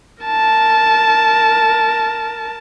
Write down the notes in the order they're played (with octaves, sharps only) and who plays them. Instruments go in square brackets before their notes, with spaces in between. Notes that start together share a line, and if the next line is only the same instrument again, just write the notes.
[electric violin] A#4 A5